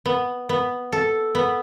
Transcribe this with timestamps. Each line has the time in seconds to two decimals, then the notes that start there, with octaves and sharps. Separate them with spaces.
0.06 B3
0.49 B3
0.92 A4
1.35 B3